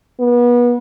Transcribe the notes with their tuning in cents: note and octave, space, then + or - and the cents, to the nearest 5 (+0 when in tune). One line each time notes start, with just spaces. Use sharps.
B3 -30